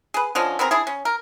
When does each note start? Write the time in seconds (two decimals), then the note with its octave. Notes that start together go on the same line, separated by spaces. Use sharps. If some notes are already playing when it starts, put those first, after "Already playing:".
0.14 G#4 B4
0.35 D3 F3 C#4 D#5
0.59 B3 C4 G#4 A#4
0.71 D4 E4 G#4
0.87 C#4
1.05 A#4